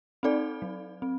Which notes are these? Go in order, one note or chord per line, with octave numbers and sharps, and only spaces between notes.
C4 D#4 A4 D5
F#3
C4